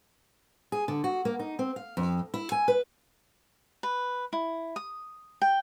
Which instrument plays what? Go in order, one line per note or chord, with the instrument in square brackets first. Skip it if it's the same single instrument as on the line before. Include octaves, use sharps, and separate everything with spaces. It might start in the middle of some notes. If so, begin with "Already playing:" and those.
[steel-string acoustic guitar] G#4
D3
F#4
A#3
D#4
C4
F5
F2
E4
G#5
B4
[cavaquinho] B4
E4
D#6
G5